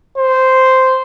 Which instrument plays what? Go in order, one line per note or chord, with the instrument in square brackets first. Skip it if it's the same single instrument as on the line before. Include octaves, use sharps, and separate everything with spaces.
[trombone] C5